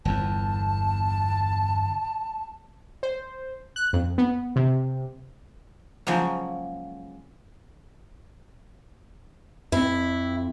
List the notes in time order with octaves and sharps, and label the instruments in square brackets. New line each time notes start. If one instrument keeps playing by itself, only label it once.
[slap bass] G1 E2 [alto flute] A5
[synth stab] C5
F#6
F2
B3
C3
[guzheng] C#3 F3 F#3 G#3 A#3
[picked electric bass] F2 C4 [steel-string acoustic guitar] E4